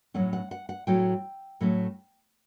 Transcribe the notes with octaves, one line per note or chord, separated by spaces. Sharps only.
A2 F#3 A3 C#4 F#5
F#5
F#5
F#5
A2 F#3 A3 C#4 G5
A2 F#3 A3 C#4